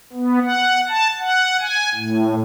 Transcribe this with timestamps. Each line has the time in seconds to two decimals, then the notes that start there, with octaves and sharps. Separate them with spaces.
0.13 B3
0.42 F#5
0.89 A5
1.19 F#5
1.60 G#5
1.95 A2